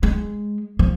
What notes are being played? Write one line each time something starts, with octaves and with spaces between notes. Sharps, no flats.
G#3
F3